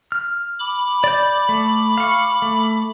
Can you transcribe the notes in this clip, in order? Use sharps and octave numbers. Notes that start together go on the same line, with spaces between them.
F6
B5 D6
D5 G6
A3
F5 C#6
A3